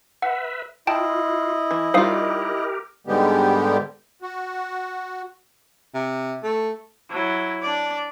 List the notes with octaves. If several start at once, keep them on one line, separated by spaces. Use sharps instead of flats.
B4 E5 F#5
E4 F4 D#5 G5 A5
E3
G3 D#4 F4 G4 A#4 C5 F5 D#6
G#2 D3 G3 G#3 B3 G4
F#4
C3
A3
F#3 E4
D4 D5